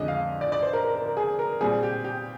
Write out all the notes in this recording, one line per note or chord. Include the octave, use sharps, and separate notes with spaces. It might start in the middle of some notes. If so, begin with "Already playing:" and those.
Already playing: F2 D3 G#3 D4 D#5
F5
D5
D5
C5
A#4
A#4
A#4
A#4
G#4
A#4
A#2 G3 C4 G#4
G4
G4